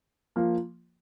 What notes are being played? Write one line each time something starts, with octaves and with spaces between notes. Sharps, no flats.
F3 A#3